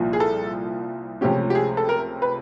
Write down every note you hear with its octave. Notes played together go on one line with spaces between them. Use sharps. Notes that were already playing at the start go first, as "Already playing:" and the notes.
Already playing: C2 A#2 F3 A#3
G#4
A4
C#2 C3 F3 A3 C#4 G4
G4
G#4
A4
A#4
B4